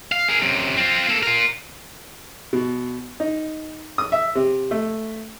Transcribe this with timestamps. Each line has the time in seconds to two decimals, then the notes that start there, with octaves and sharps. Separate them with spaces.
0.12 F5
0.29 G#4 A#4
0.42 F#2 C3
0.77 C4 F4
1.08 A#3 A4
1.23 F4 A#4
2.53 B2
3.20 D#4
3.98 D#6
4.12 E5
4.35 C3
4.71 A3